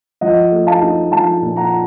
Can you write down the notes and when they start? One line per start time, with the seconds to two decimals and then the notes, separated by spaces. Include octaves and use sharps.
0.21 F3 D#5 F#5
0.52 A3
0.67 F5 A5
0.82 D#4
1.12 F3 F5 A5
1.42 A#2
1.57 F#5 A#5